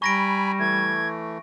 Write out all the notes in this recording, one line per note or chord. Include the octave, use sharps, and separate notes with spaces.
G3 G#5 A#5 B5 C#6 A#6 D7
E3 A3 G#6